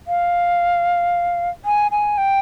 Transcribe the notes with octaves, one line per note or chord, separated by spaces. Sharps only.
F5
G#5
G#5
G5